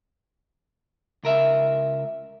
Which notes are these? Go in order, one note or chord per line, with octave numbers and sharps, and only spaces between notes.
C#2 A#4 E5